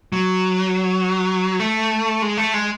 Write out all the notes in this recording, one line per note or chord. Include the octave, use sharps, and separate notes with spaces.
F#3
A3
G#3
A3
G#3